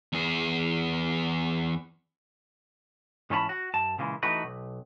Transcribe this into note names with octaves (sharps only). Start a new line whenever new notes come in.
E2 G#4
G#2 E3 C#4 C#5 A5 B5
F#4
F#2 A5
A#2 C#3 E3 G#3
E3 A3 D#4 F#4 B4
B1